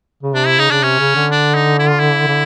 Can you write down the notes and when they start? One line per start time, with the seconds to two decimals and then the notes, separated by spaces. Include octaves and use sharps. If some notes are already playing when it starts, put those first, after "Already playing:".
0.23 C#3
0.34 C3 D4
0.47 E4
0.58 C#3 D#4
0.70 C#3 D4
0.82 C3 C#4
0.99 C#3
1.15 D3
1.31 D4
1.55 D#4
1.79 E4
1.89 F4
1.99 E4
2.28 D3